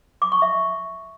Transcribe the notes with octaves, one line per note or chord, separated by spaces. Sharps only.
D6
C#6
E5